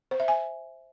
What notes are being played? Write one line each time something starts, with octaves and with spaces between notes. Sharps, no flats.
C5
E5
G#5